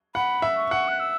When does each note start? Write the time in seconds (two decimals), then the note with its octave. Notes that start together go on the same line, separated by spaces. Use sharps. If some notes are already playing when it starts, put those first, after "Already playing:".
0.15 F#5 B5
0.42 E5
0.57 C#6
0.71 F#5
0.88 F#6
1.00 E6